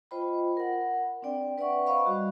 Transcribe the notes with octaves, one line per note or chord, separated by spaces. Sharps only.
F4 C5 D#5 G5 B5
A#4 F#5
C4 D4 D5 G5
B4 D5 E5 F#5 C#6
C5 D#5 F5 B5 C#6
G3 F#4